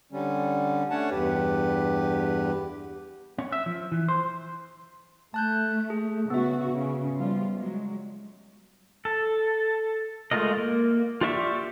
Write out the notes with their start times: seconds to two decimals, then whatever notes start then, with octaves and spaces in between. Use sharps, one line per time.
0.12 D3 G3 C#4
0.90 A3 C#4 D4 C#5 F#5 A5
1.11 E2 G2 G4 B4
3.38 C#4
3.52 E5
3.66 F3
3.92 E3
4.08 C5
5.34 A3 A5 F#6 G6
5.90 G#4
6.30 C#3 B3 F#4 E5
6.71 C#3
7.18 F3 G3 F4
7.56 F#3 G#3
9.05 A4
10.31 G#3 A3 F4 A#4 D#5
10.57 A#3
11.21 F4 G4 D5 E5 C#6